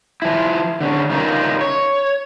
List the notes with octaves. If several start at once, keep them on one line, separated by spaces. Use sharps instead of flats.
F3 E4
D3 C#4
C#3 D#4 F4 A#4
C#5